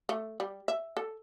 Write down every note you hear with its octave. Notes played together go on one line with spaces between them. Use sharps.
A3
G3
E5
A4